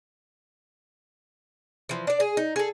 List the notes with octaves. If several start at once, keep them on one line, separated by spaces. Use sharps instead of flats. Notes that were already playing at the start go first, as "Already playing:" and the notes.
E3 F3
D4 D5
G#4
D#4
G#4 A4